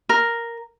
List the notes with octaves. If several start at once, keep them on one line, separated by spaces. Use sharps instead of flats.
A#4